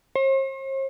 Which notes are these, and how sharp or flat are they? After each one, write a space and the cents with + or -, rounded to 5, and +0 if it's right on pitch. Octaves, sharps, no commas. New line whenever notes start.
C5 +45